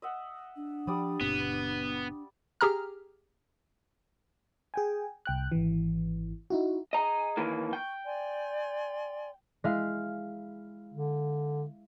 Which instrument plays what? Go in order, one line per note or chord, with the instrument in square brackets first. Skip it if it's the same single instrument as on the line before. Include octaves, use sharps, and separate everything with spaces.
[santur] D#5 E5 F#5
[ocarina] D4
[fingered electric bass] F3 [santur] G3 D5 D#6
[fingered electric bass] F#1 A#2 C4 [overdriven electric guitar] B3
[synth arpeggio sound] G4 G#4 A#5 F6
[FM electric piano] G#4 G5 G#5
C2 G5 F#6
G#1 E3
D#4 E4 F#4
[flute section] G#4 G#5 [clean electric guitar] D#5 A#5
[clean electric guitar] D#3 E3 A#3
[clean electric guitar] G5 [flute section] C#6
[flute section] D5 G#5 C6
[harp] G#3 E4 F5
[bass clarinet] D3